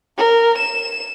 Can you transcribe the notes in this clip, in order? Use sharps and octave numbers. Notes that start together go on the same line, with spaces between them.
A#4
E7